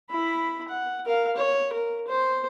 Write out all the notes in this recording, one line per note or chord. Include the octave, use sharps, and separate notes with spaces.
E4 B5
F#5
A#4 F5
C#5
A#4
C5